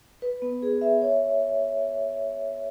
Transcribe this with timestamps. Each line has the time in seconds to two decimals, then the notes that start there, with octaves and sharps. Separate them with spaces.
0.22 B4
0.42 B3
0.62 G#4
0.81 E5
1.02 C#5